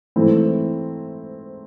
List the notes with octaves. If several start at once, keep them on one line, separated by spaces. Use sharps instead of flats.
G#2 E3 A3 C4 E4